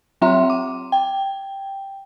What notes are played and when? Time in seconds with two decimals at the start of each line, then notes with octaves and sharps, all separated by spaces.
0.21 F#3 C4 F4 E5 A#5 C6
0.50 D6
0.92 G5